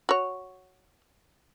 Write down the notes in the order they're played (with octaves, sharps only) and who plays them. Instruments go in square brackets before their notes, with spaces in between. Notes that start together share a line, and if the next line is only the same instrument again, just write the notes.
[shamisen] F#4 C#5